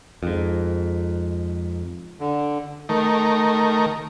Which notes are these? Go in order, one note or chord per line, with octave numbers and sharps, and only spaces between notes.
F2 G#2
D3
D#3 A3 A#4